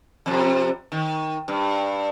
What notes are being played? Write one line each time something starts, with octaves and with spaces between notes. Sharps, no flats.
F2 C3
D#3
G2